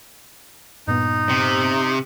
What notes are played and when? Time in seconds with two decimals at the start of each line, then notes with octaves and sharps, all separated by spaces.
0.87 G2 A#2 B3 D#4
1.29 C3